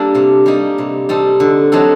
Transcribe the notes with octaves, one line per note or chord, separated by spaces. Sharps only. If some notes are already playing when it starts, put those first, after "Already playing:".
Already playing: G3 A#3 D4 A4
C3
G3 A#3 D#4 G4
C3
G3 C4 D#4 A4
D3
F#3 C4 D#4 A4